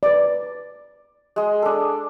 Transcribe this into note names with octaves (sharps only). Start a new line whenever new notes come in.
B4 D5
G#3 G#4
D4 A4